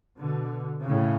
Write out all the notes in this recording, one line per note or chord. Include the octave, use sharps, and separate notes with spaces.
B2 D3
A2 C#3